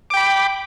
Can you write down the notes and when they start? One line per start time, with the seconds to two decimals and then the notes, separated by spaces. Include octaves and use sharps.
0.10 D6
0.14 G5
0.17 B5